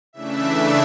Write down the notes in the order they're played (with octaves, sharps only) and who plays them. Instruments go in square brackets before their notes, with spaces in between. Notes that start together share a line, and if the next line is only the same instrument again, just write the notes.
[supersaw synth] C#3 E3 A3 D4 E5